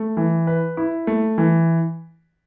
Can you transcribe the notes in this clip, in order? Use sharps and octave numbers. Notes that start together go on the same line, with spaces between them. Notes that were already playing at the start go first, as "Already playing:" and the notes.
Already playing: A3
E3
B4
E4
A3
E3